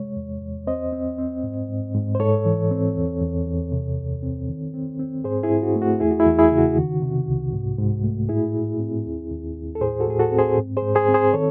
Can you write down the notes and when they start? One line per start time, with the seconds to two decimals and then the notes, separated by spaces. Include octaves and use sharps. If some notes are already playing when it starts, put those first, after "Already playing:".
Already playing: C3 G#3 C#5
0.17 E2
0.42 E2
0.67 C4 C5 D#5
0.93 C4
1.18 C4
1.44 G#2
1.69 G#2
1.95 G#2
2.15 C5
2.20 G#2 A4 C#5
2.45 E3
2.71 C4
2.96 E2
3.21 E2
3.46 E2
3.72 C3
3.98 C#2
4.23 C4
4.49 D#3
4.74 C4
4.99 C4
5.24 G#2 G#4 C5
5.43 E4 G#4
5.50 G#2
5.63 F#4
5.76 A3
5.82 F#4
6.00 E2 E4 G#4
6.11 F#4
6.20 E4 G#4
6.26 E2
6.39 E4 G#4
6.52 C#3
6.58 F#4
6.77 D#3
7.02 C3
7.28 C2
7.53 G#2
7.78 G#2
8.04 A3
8.29 A2 E4 G#4
8.55 A2
8.80 C4
9.05 D#2
9.30 D#2
9.56 D#2
9.75 A4
9.81 A2 G#4 C5
10.00 F#4 A4
10.07 A2 G#4
10.19 F#4 A4
10.32 C4
10.39 G#4 C5
10.57 G#2
10.77 G#4 C5
10.82 G#2
10.95 G#4 C5
11.08 C4
11.14 G#4 C5
11.33 D#3 A4 C#5